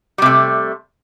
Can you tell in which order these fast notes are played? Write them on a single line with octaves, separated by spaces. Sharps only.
G3 C3 A3